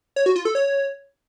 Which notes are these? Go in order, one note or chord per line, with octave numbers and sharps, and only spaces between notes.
C#5
F#4
F4
A4
C#5